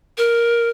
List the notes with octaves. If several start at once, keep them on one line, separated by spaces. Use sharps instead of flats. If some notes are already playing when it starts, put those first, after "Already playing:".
A#4